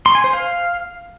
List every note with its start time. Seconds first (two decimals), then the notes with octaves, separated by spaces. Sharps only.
0.06 C6
0.15 G#5
0.24 C5
0.33 F5